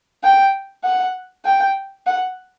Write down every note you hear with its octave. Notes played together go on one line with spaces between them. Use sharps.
G5
F#5
G5
F#5